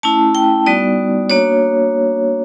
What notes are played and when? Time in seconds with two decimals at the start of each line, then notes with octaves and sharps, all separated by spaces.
0.03 A3 C#4 E4 A5
0.35 G5
0.66 G3 B3 D#4 F#4 D5
1.30 A#3 D4 F#4 C#5